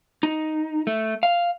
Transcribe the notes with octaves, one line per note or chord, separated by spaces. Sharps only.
D#4
A3
F5